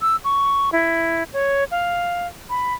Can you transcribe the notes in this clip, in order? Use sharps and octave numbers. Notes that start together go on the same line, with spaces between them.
E6
C#6
E4
C#5
F5
B5